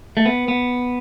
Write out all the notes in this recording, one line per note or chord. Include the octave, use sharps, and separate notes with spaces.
A3
B3
B3